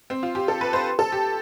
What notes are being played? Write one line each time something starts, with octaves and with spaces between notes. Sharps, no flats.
C4
F4
G4
A4
B4
C5
A4
G4